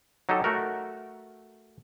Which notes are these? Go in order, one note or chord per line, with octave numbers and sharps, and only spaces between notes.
F#3 D#4 G4 A4
A3 F#4 A#4